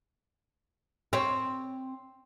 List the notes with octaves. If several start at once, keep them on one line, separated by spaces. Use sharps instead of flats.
C4 C#5